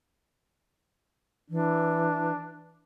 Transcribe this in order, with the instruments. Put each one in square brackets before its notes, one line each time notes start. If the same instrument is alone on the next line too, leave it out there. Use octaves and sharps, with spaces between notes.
[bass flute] E3 [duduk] D4